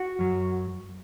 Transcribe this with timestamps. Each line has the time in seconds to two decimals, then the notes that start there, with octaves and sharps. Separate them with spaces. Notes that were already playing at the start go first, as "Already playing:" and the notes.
Already playing: F#4
0.19 F#2 F#3